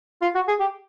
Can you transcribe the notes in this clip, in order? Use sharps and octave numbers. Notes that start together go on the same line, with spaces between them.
F4
F#4
G#4
G4